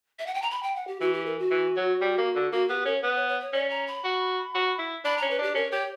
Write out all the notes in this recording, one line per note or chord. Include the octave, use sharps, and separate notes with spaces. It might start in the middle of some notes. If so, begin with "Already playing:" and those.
E5
F#5
G5
A#5
B5
G5
F#5
G4
E3 F#4
G4
A#4
F#4
E3
F#3
G3
A#3
D3
A#3 F#4
B3 G4
C#4 A#4
C#5
B3 B4
C#5
C#5
C#5
C#4 D5
A#5
B5
F#4
F#4
E4
D4 B5
C#4 A#5
B4
D4 G4
C#4 A#4
G4 C#5